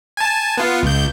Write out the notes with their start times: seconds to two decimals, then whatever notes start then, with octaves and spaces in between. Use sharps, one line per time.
0.17 G#5 A5
0.58 B3 F4
0.83 C#2 G6